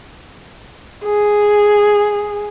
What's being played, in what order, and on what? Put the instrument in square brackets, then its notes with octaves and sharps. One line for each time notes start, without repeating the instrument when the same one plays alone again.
[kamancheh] G#4